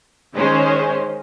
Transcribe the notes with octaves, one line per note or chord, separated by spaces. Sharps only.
D#3 G#3 C#4 C5